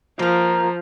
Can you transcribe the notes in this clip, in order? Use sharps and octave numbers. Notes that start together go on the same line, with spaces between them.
F3 A#3 A#4